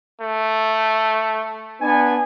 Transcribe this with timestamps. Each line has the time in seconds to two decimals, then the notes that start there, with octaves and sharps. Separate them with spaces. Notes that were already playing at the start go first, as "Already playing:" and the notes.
0.21 A3
1.82 B3 D4 G#5